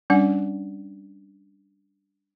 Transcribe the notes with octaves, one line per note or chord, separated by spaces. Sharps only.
G3 C#4 D4 F#5